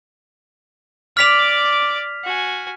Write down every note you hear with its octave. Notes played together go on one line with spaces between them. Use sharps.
D5 D6 F6 B6 F7
F#4 G#5